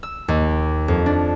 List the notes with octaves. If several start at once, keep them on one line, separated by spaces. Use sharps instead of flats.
E6
D#2
F2
D4